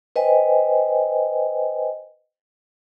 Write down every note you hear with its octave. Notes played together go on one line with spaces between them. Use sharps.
B4 C5 D#5 G5 G#5